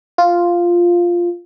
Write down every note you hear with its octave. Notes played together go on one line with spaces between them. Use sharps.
F4